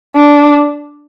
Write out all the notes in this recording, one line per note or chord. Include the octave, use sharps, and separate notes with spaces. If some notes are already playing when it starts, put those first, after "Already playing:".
D4